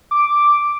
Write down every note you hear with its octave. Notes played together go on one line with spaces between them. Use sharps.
D6